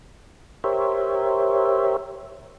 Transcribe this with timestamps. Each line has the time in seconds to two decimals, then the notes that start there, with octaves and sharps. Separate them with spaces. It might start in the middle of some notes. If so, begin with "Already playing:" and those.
0.64 G4 A#4 C5 C#5 E5